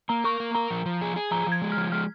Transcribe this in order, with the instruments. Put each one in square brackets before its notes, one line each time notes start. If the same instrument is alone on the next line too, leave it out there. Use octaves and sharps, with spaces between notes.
[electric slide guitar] A#3 [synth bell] A#5
[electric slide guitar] A#4 [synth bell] C#6
[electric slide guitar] A#3
[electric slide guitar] A#4 [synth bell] A#5
[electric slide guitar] F3
F3
G#4
G#4
[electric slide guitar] F3 [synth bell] A#5
[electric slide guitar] F3
[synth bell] G#6
[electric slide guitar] G#3
[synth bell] F6
[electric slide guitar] F3
[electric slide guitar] G#3 [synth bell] F6